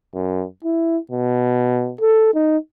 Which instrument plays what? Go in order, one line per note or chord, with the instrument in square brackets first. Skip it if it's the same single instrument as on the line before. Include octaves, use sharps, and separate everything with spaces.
[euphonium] F#2
E4
B2
A4
D#4